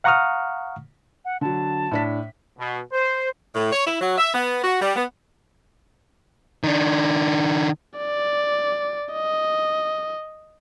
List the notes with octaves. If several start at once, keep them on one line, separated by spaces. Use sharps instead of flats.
F5 F#5 A#5 C#6 D#6 F6
F#5
D3 F#3 A5
A2 D4 B6
B2
C5
A2
C#5
E4
F#3
E5
B3
F#4
G3
B3
D#3 D4
D5
D#5